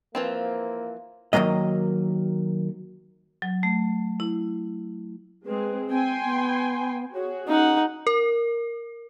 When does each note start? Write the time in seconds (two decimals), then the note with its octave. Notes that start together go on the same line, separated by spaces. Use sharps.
0.15 E3 F3 A#3 C4
1.33 D#3 E3 F#3 A#3 D#5
3.42 F#3
3.63 A3
4.20 E4
5.46 G#3 C4 G#4 B4
5.90 C4 G5 G#5 C6
6.24 B3
7.13 F#4 G#4 C#5
7.48 C#4 D#4 F#5
8.07 A#4